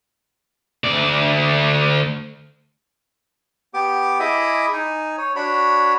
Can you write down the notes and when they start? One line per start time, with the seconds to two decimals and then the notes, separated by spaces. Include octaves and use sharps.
0.84 D2 D5
3.74 B3 G4 D6
4.20 E4 G#4 D#5 E5 D6 D#6
4.73 D#4 G#5
5.18 C#5
5.36 D4 F#4 C#5 B5